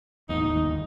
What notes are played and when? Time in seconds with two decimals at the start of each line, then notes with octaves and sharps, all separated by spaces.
0.29 E2 A2 D#3 D#4
0.43 G1 D#2